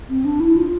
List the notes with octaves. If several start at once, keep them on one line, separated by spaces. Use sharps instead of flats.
C4
D4
E4
F4